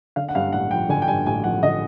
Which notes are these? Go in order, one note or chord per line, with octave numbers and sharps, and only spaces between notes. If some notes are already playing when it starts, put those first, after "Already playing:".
D3 F5
F#5
G2 F5
A1 F#5
F3 G5
D3 G#5
G5
G2 G#5
A1 G#5
F3 F#5
D3 D#5